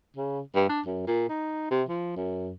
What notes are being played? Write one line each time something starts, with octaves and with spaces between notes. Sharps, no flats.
C#3
G2
D4
F#2
A#2
D#4
C3
F3
F#2